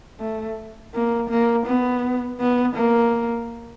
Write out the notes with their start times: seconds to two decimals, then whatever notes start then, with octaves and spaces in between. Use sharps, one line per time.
0.20 A3
0.94 A#3
1.30 A#3
1.66 B3
2.40 B3
2.76 A#3